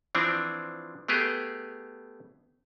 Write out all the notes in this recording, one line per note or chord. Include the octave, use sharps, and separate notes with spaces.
E3 F3 C4 D4
A3 B3 G4 G#4